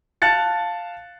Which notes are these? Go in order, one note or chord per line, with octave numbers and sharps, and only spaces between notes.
F5 A5 F#6 A6 C#7